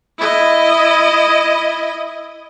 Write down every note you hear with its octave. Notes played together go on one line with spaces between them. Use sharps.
E4 D#5